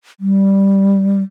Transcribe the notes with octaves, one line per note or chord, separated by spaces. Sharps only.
G3